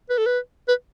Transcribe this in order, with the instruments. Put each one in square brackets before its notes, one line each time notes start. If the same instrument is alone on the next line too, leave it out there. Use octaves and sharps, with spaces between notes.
[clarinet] B4
A4
B4
B4